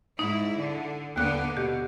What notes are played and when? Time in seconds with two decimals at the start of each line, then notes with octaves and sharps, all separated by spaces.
0.19 G#2 D#4 E4
0.56 D3
1.16 D#2 D3 A#3 B3 F#6
1.57 B2 G4